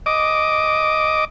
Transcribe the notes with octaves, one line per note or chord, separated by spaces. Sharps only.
D#5 D6